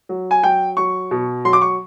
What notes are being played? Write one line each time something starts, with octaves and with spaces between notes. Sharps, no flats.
F#3
G#5
F#3 G5
F#3 C#6
B2
F#3 C6
D6
C#6